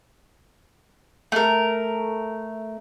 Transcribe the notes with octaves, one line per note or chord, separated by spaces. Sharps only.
A3 A#4